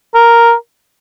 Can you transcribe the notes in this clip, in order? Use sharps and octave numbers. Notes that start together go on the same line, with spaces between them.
A#4